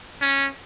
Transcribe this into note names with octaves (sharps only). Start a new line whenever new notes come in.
C#4